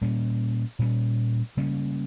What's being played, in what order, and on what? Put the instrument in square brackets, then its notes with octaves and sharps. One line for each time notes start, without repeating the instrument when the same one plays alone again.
[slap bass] A#2 G3 A#3 C#4
A#2 G3 A#3 C#4
C#3 G3 A#3 C#4